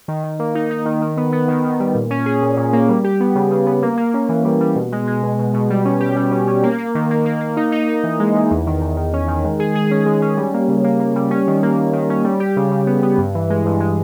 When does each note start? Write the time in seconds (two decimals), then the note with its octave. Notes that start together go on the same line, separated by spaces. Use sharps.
0.08 D#3
0.23 D#3
0.39 A#3
0.55 D#4
0.71 D#4
0.86 D#3
1.02 D#3
1.17 B3
1.33 B3
1.48 D#3
1.64 D#3
1.80 G3
1.95 A#2
2.10 C#4
2.26 G#4
2.42 A#2
2.57 A#2
2.73 A#3
2.89 G3
3.04 G4
3.20 B3
3.35 C#3
3.51 C#3
3.66 B3
3.82 A#3
3.97 A#3
4.14 C#4
4.29 E3
4.45 G3
4.61 G3
4.75 B2
4.92 G#3
5.07 G#3
5.23 B2
5.39 B2
5.54 B2
5.70 G3
5.85 C#4
6.00 G4
6.16 G3
6.31 C#4
6.47 C#4
6.63 A#3
6.78 A#3
6.95 D#3
7.11 A#3
7.26 A#3
7.41 A#3
7.57 D#4
7.72 D#4
7.89 D#4
8.04 E3
8.20 G#3
8.35 E3
8.51 E2
8.67 D#3
8.82 E2
8.97 D#3
9.13 C#4
9.28 D#3
9.44 G#3
9.59 G#4
9.75 G#4
9.91 C#4
10.06 G#3
10.22 C#4
10.37 G3
10.54 A#3
10.68 C#3
10.84 A#3
11.00 A#3
11.16 G3
11.31 C#4
11.47 D#3
11.63 A#3
11.78 A#3
11.93 D#3
12.10 C#4
12.24 G3
12.40 G4
12.56 C#3
12.71 C#3
12.87 B3
13.03 B3
13.18 G2
13.35 E3
13.50 G#3
13.66 G2
13.80 G#3